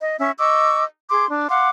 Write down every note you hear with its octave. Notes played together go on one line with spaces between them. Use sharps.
D#5
C#4 E5 C#6
D#5 C#6 D6 E6
G#4 C6 D6
D4
F5 F#5 C6 D6